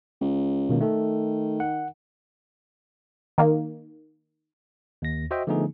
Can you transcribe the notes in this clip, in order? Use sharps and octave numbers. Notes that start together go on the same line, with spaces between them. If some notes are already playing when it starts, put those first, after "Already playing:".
C#2
B2 D#3 A#3
D#3 A3 A4
F#5
D#3 A#3
D#2 A#6
F#4 C5 D#5 E5 G5
D3 F3 A3 B3 D#4 G#4